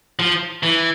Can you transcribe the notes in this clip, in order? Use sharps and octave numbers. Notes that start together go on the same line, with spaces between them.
F3
E3